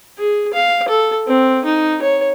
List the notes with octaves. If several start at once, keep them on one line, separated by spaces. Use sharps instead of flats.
G#4
F5
A4
C4
D#4
C#5